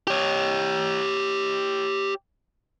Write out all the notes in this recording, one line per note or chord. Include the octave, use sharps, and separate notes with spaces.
G4 C#5